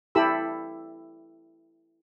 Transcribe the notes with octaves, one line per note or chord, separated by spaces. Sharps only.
E4 G4 A4 B5 E6